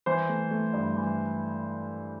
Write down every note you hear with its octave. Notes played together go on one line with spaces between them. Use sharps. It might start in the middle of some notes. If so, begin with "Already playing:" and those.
E3 C5
A3
A3
G2
E3